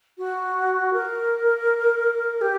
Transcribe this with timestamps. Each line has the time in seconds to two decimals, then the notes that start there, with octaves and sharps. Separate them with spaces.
0.18 F#4
0.93 A#4
2.41 G4